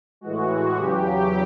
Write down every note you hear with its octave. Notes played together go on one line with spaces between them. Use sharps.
A2 E3 G#3 F#4
E2 C#3 F#3 G4